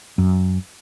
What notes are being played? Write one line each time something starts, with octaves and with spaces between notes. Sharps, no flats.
F#2